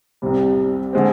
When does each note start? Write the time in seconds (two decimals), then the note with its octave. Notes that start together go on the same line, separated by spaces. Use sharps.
0.22 C2 C3 G3
0.93 D3 G#3 C4